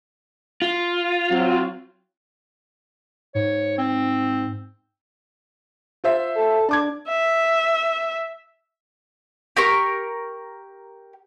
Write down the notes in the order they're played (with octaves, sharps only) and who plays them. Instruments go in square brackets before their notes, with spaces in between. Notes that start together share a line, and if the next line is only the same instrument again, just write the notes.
[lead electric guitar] F4
[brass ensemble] F#3 C4
[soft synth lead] G#2 [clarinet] C#5
[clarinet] C4
[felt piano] F4 C5 E5
[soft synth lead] A4
[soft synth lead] D4 [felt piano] A5 D6 G#6
[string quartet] E5
[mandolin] G4 A#4 C#6